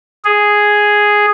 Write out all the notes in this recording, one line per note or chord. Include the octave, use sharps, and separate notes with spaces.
G#4